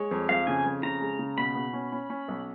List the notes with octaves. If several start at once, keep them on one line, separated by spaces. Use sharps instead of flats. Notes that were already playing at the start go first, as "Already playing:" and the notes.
Already playing: G#3 C#5
F2
F2 F5
C#3 G#5
F2
C#3 A#5
G#3
C#3
B2 B5
B2
C#4
C#4
C#4
B1